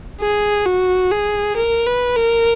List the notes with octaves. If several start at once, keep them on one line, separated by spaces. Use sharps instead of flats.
G#4
F#4
G#4
A#4
B4
A#4